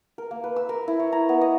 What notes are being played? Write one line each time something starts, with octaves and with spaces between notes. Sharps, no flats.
A#4
A#3
B4
E6
A#4
E4
C#5
A#5
B3
D#5